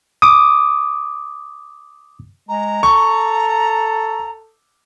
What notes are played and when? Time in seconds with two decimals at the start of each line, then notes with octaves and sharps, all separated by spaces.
0.22 D6 D#6
2.49 G#3 A#5
2.83 A4 C#6